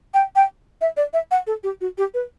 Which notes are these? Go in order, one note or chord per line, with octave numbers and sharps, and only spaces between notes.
G5
G5
E5
D5
E5
F#5
A4
G4
F#4
G4
B4